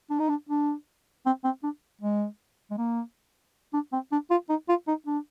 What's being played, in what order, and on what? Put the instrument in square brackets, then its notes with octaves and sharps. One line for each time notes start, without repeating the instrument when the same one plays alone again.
[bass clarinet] D4
D#4
D4
D4
C4
C4
D4
G#3
G#3
A#3
D4
C4
D4
F4
D#4
F4
D#4
D4